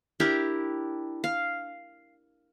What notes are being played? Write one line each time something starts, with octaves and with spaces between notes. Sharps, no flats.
D4 E4 G4 A#4
F5